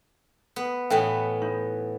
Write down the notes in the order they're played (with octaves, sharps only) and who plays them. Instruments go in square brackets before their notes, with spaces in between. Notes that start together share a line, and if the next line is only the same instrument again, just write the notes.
[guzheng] B3
[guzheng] A2 E3 B3 [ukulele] G5
[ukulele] D#4